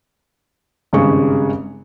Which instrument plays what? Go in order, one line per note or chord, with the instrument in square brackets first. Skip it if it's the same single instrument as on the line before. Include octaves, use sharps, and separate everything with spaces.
[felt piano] G#1 G2 C#3 G#3 C#6